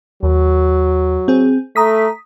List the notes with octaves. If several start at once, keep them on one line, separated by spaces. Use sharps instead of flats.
D#2 F#3
C4 G#4
A3 A#5 D#6 B6